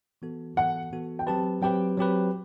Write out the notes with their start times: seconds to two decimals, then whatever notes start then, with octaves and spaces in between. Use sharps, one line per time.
0.22 E3 B3 F#4 A4
0.56 E3 B3 F#4 A4 F#5
0.92 E3 B3 F#4 A4
1.19 G5
1.27 F#3 C4 G4 B4 A5
1.62 F#3 C4 G4 B4 G5
1.98 F#3 C4 G4 B4